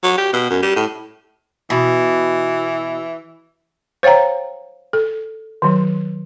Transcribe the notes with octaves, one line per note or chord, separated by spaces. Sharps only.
F#3
G4
B2
F#2
G3
A2
B2 E3
C5 C#5 F5 G5 A#5
A4
D#3 F#3